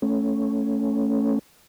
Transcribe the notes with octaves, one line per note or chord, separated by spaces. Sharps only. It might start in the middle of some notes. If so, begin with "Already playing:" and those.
A3 C#4